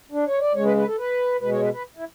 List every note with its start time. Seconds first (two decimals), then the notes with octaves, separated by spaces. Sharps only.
0.12 D4
0.26 C#5
0.40 D5
0.54 C#3 G#3 C#5
0.65 B4
0.77 B4
0.87 A4
0.98 B4
1.41 B2 G#3 B4
1.51 C#5
1.62 B4
1.73 B4
1.97 E4